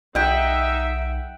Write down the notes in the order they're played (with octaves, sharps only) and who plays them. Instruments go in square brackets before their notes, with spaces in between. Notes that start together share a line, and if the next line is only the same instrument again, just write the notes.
[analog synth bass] B1 [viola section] D#4 E5 [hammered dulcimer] F#5 G5